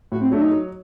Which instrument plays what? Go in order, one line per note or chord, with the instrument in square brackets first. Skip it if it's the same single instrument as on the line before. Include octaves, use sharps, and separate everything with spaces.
[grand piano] A2 [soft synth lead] F#4
[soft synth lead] C4
[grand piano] F#3 A3 [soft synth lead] D4
[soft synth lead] D#4
[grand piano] F#3